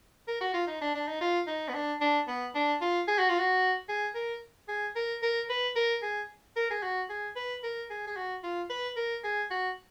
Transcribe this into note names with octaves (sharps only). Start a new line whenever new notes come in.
A#4
F#4
F4
D#4
D4
D4
D#4
F4
D#4
B3
D4
D4
B3
D4
F4
G#4
F#4
F4
F#4
G#4
A#4
G#4
A#4
A#4
B4
A#4
G#4
A#4
G#4
F#4
G#4
B4
A#4
G#4
G#4
F#4
F4
B4
A#4
G#4
F#4